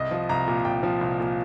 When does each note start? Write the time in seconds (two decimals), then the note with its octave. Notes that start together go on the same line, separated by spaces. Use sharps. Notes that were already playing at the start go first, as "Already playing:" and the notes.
Already playing: C2 D#5
0.11 F3
0.29 C2 A#5
0.48 A#2
0.65 C2 G5
0.83 F3
1.01 C2
1.20 A#2